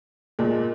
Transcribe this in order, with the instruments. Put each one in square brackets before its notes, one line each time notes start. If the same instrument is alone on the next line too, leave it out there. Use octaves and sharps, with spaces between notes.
[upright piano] A#2 G#3